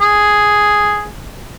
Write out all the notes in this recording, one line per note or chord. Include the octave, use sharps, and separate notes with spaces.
G#4